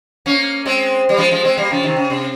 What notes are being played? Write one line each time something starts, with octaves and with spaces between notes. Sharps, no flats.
A#3 C#4
G#3 C4
G3
F3 G#3
F3 G#3
G#3 C4
G3 A#3
C#3 F3
C3 D#3
C#3
C3